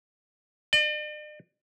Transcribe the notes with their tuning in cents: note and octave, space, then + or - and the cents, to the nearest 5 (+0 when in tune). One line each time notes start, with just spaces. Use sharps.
D5 +45